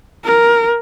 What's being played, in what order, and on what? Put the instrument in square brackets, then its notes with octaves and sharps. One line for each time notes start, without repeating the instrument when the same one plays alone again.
[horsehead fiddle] A#4